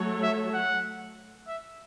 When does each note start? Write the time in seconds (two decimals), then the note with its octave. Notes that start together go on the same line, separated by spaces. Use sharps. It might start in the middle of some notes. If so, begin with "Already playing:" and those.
Already playing: F#3 A3 F#4 A4 C#5
0.23 E5
0.54 F#5
1.47 E5